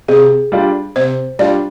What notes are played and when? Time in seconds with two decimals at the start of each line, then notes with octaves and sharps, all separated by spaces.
0.08 C3 G#4
0.52 G3 D4 F4
0.96 C3 C5
1.39 G3 D4 F4 D5